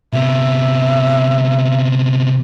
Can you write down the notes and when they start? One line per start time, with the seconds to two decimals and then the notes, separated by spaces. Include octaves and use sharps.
0.13 C3 B3 E5